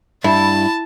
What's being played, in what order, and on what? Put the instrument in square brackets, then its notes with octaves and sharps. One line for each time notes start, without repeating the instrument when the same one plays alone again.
[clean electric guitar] G2 [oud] E4 [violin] A5